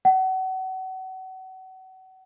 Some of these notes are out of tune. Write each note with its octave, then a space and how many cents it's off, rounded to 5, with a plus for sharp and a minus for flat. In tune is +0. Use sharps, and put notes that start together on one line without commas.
F#5 +30